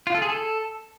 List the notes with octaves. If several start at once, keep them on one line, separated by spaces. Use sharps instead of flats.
F4
A4
G#4
A4